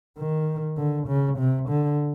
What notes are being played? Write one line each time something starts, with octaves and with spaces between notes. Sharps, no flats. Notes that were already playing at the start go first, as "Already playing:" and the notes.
D#3
D3
C#3
C3
D3